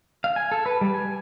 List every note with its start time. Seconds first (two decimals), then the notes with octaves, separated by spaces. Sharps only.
0.24 F5
0.36 G#5
0.52 A4
0.66 B4
0.81 G3
0.94 G#5